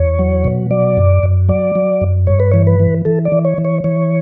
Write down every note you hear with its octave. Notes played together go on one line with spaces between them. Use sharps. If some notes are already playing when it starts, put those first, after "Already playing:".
Already playing: E2 C#5
F#3
B2
F#3 D5
F#2
F#2
F#3 D5
F#3
F#2
G2 C#5
B4
E3 C#5
B4
E3
E3 A4
D5
E3
C#5
E3
C#5
E3 C#5